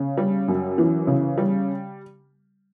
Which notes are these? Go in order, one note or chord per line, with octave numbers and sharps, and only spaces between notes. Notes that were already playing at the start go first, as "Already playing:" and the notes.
Already playing: C#3
G3
F#2
E3
C#3
G3